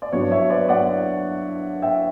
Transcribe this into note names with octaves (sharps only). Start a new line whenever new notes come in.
D5
G2 F#3 B3 D4 C#5
C#5 E5
B4 D5
D5 F#5
E5 G5